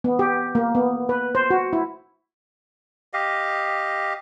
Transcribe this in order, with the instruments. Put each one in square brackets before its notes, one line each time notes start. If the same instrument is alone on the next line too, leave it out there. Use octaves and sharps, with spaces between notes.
[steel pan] B3
G4
A#3
B3
B4
C5
F#4
E4
[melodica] G4 D#5 F5